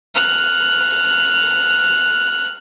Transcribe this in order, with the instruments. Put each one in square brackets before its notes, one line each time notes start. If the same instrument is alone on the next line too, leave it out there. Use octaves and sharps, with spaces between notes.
[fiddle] F6 F#6